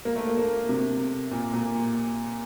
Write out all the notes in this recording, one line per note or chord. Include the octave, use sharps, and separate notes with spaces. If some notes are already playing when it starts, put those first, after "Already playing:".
A#3
A3
A#3
A#3
C3
A#2
A#2